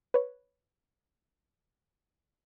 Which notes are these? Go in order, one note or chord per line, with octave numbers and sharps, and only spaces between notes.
B4 C#5